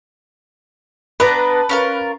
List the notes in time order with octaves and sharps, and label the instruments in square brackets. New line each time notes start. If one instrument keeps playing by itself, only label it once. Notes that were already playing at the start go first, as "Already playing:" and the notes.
[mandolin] B3 D4 A#5 [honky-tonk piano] B4
[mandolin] C#4 F4 A#4